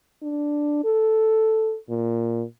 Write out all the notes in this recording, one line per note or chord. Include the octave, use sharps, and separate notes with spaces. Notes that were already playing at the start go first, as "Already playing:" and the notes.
D4
A4
A#2